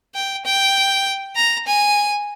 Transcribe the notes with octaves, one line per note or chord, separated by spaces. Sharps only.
G5
G5
A#5
G#5